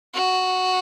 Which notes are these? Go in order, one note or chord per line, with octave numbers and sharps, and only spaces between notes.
F#4